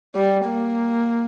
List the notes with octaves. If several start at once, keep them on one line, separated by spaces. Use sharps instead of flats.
G3
A#3